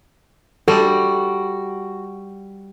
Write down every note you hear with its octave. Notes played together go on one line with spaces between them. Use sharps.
G3 F#4 A4